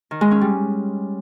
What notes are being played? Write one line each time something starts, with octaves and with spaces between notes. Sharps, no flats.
D#3
G#3
C#4
G3